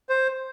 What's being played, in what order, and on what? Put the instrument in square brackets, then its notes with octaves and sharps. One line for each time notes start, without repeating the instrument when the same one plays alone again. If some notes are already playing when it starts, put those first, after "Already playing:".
[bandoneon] C5